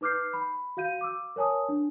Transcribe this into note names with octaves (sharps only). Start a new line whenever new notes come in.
D#4 B4 D6 F6 G6 C7
B5
F#4 F5 G6 D#7
D6 E6
A#4 C#5 G#5 A5 D#6
D4